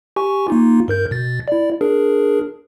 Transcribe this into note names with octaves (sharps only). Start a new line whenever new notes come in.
G4 G#5 C#6
A#3 D#4 F4
G2 A#4 G6
B2 A6
E4 D5
D4 G#4 A#4